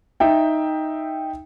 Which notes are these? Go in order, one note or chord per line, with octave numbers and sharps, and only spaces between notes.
D#4 E5 G5